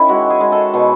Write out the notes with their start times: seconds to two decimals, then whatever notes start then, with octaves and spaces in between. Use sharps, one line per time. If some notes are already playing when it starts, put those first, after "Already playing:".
Already playing: D#3 C#4 E4
0.09 G#3 F#4
0.30 G#4
0.41 G#3
0.52 A4
0.74 B2